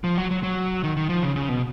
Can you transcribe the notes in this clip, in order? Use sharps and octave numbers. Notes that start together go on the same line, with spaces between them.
F3
F#3
F#3
F#3
D#3
D#3
F3
C#3
C#3
B2